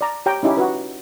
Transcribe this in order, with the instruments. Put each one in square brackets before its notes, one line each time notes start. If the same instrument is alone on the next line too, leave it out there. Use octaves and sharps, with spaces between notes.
[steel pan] D5 A#5
G4 C#5 G5 A#5
C#4 D#4 E4 G4
F#4 B4